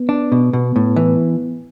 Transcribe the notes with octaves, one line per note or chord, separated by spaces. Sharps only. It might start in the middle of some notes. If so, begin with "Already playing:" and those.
Already playing: B3
D4
B2
B2
A2
E3